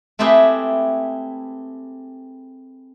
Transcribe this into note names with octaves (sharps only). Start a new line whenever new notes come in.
A3 C4 E4 G4 G#4 B4